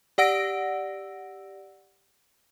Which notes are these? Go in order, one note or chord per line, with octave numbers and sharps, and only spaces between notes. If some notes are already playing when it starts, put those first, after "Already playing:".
G4 D5 F#5 E6 A#6 D7